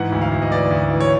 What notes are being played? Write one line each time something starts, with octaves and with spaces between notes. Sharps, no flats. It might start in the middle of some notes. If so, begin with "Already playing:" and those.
Already playing: G#2 E3 F#5
D2
F5
D2
D#5
E3 D5
D2
E3
C#5